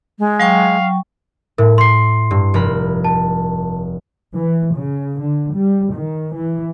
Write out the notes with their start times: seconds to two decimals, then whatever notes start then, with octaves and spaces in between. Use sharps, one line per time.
0.19 G#3
0.40 F#3 F5 G5 C#6
1.58 A2 A#4
1.78 C6 C7
2.31 G2
2.54 F1 A#4 B5
3.05 A5
4.34 E3
4.76 C#3
5.22 D3
5.54 G3
5.94 D#3
6.35 E3